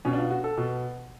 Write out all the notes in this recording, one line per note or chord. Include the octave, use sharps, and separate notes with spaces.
B2 C#4
D4
F4
F#4
A4
B2